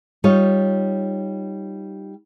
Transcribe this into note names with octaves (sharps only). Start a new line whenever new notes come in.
G3 D#4 F4 C#5